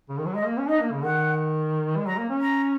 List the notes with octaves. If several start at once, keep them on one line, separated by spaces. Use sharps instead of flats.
C#3
D#3
F#3
G#3 D#5
A#3
C#4
D#4 D#5
A#3
C#3
D#3 F#5
G#3
F#3 A#5
A#3
C#4
A#5